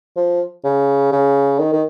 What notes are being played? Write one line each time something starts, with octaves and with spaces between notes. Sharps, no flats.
F3
C#3
C#3
D#3
D#3